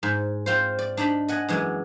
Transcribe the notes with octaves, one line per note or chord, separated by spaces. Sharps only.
G#2
C4 F4 C5
D5
D4 D#4 D5 B5
D#5 F#5 G#5
F#2 E3 G#3